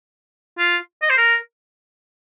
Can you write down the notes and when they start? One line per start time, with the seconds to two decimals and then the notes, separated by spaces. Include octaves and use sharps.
0.58 F4
1.02 D#5
1.10 C5
1.17 A#4